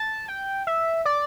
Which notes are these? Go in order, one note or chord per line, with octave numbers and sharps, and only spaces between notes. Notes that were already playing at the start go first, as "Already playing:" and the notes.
Already playing: A5
G5
E5
D5